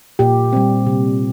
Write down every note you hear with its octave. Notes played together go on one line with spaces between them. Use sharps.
A#2 G4
G3 C4
C3